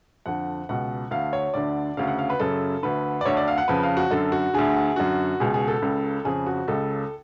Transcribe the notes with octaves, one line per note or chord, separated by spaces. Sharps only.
F2 D3 F#5
C#2 B2 F#5
D2 D3 F5
C#5
D2 D3 D5
D2 C#3 F5
F#5
F5
B4
F#2 C#3 A4
D2 D3 B4
D5
D2 D3 C#5
D5
F5
F#5
F2 C#3 B4
F5
F#4
F#2 D3 A4
F#4
D2 D3 G#4
F#2 D3 F#4
C#2 B2 G#4
G#4
A4
C#2 C#3
F2 C#3 G#4
F#4
C#2 C#3 A4